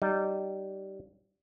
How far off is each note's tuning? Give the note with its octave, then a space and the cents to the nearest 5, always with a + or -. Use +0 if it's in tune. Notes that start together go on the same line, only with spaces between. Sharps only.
G3 -20 D#4 -20